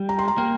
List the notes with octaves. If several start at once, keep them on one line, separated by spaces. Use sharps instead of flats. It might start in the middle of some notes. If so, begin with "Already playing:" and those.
Already playing: G3
A#5
C6
A#5
A#3 G5